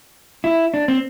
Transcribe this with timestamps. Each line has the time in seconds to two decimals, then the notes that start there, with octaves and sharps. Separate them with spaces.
0.44 E4
0.74 D4
0.88 C4